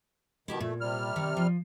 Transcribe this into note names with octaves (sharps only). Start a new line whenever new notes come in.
B2 D#3 E4 G4 A5
A#2 A3
C3 G3 F6
D#3
F3